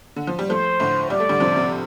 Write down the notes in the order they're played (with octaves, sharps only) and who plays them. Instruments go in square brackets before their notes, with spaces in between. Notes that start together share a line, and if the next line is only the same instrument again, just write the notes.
[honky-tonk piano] D3
F3
G3
[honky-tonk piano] F3 A3 [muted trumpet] C5
[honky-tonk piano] A2 D3
[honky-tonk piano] G3 [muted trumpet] D5
[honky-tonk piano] A3
D3 G3
C3 F3
C3